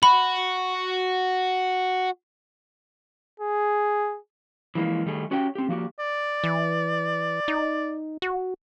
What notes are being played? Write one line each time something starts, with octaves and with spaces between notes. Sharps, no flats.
F#4 B5
G#4
E3 F3 G#3 A#3
D#3 G3 A3 G#4
C#4 F#4 G4 C#5 G5
C4 G4
F3 A#3 F#4 G4
D5
E3
D#4
F#4